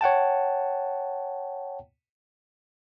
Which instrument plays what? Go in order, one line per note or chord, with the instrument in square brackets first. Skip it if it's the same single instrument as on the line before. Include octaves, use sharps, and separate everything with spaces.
[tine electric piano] C#5 F#5 G5 A5